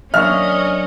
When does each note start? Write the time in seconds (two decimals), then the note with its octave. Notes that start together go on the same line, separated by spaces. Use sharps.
0.14 F#3 A#3 C#4 D4 D#5 E5 C#6 F6